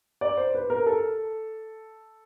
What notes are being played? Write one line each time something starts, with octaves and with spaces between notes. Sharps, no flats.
D5
C5
B4
A#4
A4